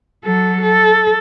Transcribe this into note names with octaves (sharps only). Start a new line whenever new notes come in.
F#3 A4
A4